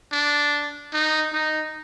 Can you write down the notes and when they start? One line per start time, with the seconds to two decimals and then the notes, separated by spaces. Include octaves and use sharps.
0.12 D4
0.93 D#4
1.33 D#4